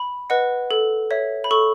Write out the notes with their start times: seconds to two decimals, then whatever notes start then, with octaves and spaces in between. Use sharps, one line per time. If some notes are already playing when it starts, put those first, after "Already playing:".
Already playing: B5
0.30 B4 D#5 F#5
0.71 A4
1.11 C#5 E5
1.44 B5
1.51 A4 C#6